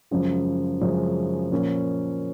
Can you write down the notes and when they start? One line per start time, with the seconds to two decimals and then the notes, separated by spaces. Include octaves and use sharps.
0.11 F#2 C#3 F3 G#3
0.81 F#2 C#3 F3 G#3
1.51 A#2 F3 A#3 C#4